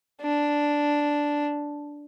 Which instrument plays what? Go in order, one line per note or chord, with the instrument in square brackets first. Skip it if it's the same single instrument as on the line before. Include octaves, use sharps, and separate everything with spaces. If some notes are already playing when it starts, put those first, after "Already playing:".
[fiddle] D4